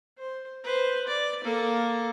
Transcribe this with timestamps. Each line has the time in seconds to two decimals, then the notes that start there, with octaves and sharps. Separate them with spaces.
0.18 C5
0.64 B4 C5
1.07 D5
1.44 A#3 A4